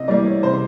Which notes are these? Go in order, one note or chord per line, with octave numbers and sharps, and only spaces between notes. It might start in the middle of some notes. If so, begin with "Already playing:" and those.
Already playing: C3 D#5
E3 G3 A#3 D5
C#5
C3 C5